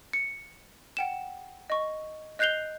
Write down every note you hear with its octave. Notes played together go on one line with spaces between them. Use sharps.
C#7
F#5 G5 E7
D#5 C#6
D#5 F#6 G6 C7 F7 G7